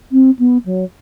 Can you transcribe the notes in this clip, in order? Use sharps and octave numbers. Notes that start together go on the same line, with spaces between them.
C4
B3
F#3